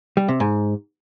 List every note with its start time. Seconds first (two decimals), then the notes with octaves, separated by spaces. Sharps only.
0.17 G3
0.29 C3
0.40 G#2